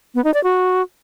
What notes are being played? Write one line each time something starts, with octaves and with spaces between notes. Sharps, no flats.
B3
D#4
D5
F#4